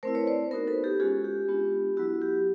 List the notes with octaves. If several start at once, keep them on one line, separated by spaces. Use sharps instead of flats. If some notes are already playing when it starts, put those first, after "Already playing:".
A3 C4 E4 A#4 C5
B4 C#5
C5 D5
B3 D#4 F#4 A#4 C5
A4 B4
G4 A4
G#3 C#4 F4 F#4 G#4
G4
G#3 B3 D4 F4
F#3 B3 E4 F#4
G4